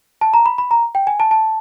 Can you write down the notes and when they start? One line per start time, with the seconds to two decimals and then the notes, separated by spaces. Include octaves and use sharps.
0.21 A5
0.34 A#5
0.46 B5
0.58 B5
0.71 A#5
0.95 G5
1.07 G#5
1.20 A5
1.31 A5